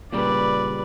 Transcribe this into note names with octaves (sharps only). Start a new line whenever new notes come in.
A#2 C#3 G3 B4 D5